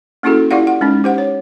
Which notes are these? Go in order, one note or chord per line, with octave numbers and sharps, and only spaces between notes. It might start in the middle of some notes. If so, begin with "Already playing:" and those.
A#3 C#4 E4 F#4 G#4 A4
E4 F4 G4 D5 F5 F#5
F#5
G#3 C#4 D#4
G4 C5 F#5
C#5